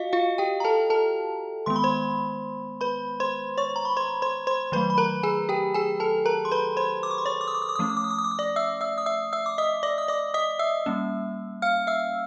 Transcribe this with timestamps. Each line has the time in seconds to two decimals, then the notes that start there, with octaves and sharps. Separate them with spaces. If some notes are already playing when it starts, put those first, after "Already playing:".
Already playing: F4 F#4 D#5 F5
0.13 F4 F5
0.38 G4 G5
0.60 A#5
0.64 A4 A5
0.90 A4 A5
1.66 D#3 G#3 B3 C6
1.76 B5
1.83 C5 C6
2.81 B4 B5
3.20 C5 C6
3.58 C#5 C#6
3.76 A#5
3.85 B5
3.97 C5 C6
4.22 C5 C6
4.47 C5 C6
4.72 D#3 F#3 A3 B4 B5
4.90 B5
4.98 A#4 A#5
5.23 G#4 G#5
5.49 G4 G5
5.74 G#4 G#5
6.00 A4 A5
6.26 A#4 A#5
6.45 C6
6.52 B4 B5
6.77 C5 C6
7.03 D6
7.11 C#6
7.18 C6
7.26 C#5 C#6
7.41 D6
7.48 D#6
7.54 D6
7.62 D#6
7.69 D6
7.76 D#6
7.79 F3 A3 C#4 D6
7.89 D#6
7.97 D6
8.04 D#6
8.11 D6
8.19 D#6
8.25 D6
8.31 D#6
8.39 D5 D6
8.56 E5 E6
8.81 E5 E6
8.98 D#6
9.06 E5 E6
9.33 E5 E6
9.46 D6
9.58 D#5 D#6
9.83 D5 D6
9.98 D#6
10.08 D5 D6
10.34 D#5 D#6
10.59 E5 E6
10.86 G3 A#3 C#4
11.62 F5 F6
11.87 E5 E6